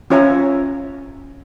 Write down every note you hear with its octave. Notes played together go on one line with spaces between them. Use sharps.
C#4 F4 C#5 E5 G#5 A#5